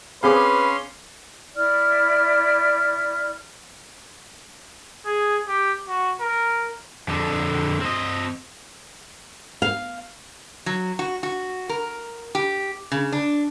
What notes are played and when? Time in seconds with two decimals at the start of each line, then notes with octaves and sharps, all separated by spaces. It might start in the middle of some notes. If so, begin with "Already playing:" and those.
0.23 C4 C#4 G#4 B4 F5 B5 C6 D6
1.54 E4 D5 F6
5.06 G#4
5.48 G4
5.88 F#4
6.21 A#4
7.08 F2 D3
7.81 C4 D#5
9.62 F5
10.66 F#3
10.99 F#4
11.23 F#4
11.69 A#4
12.35 G4
12.92 C#3
13.12 D4